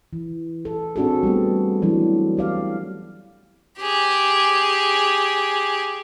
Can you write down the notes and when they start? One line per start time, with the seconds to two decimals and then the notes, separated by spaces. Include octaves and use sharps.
0.13 E3
0.65 A4
0.96 C4 D4 F#4 G#4 A4
1.23 G3 A3 B3
1.82 E3 F#3 D4
2.37 G4 D5 F5
3.80 G4 G#4